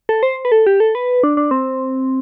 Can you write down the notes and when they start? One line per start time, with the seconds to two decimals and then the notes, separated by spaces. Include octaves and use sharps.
0.09 A4
0.23 C5
0.45 B4
0.52 A4
0.67 G4
0.80 A4
0.95 B4
1.23 D4
1.37 D4
1.51 C4